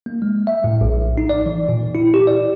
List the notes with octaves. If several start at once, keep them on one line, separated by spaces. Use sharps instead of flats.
A#3
G#3
E5
A2
A#1
D#4
D5
E3
A#2
E4
G4
D5